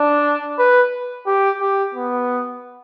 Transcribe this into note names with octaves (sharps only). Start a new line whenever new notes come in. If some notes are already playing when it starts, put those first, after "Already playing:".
Already playing: D4
B4
G4
G4
B3